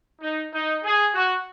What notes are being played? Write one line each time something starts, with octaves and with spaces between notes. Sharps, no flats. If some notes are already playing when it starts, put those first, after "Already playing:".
D#4
D#4
G#4
F#4